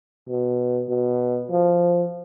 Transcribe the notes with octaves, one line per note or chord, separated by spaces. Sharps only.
B2
B2
F3